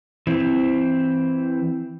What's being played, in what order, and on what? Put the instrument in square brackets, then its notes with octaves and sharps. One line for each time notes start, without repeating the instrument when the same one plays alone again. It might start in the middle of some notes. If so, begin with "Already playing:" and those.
[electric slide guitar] E3 C4